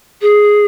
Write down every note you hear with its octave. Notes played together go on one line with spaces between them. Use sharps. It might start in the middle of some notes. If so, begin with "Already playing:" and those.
G#4